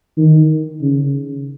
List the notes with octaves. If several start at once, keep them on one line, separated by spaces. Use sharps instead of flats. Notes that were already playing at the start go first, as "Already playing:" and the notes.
D#3
C#3